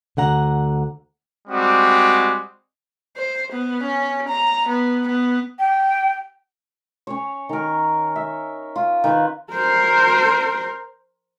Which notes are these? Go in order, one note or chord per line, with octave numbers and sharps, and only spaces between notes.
D2 D3 F#5 A#5
G3 G#3 C4 F#4 D6
C5
B3
C#4
A#5
B3
B3
G5
C#4 C#5
D#3 A#4
E5
F4
D#3 B4
A#4 C5